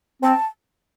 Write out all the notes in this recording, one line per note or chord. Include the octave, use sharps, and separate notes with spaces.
C4 A5